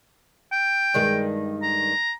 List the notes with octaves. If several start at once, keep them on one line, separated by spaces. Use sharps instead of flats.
G5
G2 D#3 G#3
A#5